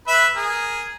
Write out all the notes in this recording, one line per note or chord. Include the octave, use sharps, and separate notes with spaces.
B4 E5 B5
G#4 A#4